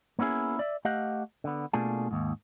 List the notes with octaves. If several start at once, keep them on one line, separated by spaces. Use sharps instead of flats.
A#3 B3 C#4 E4 G#4
D5 E5
A3 G4 D#5 F5 F#5
D3 B3
B2 A3 A#3 D4 F4 G#4
D#2 G#2